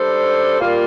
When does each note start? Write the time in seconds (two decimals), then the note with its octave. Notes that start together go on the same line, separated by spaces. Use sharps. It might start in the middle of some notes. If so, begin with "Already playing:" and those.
Already playing: G3 D4 A4 C5
0.58 A#2 G3 A#3 F4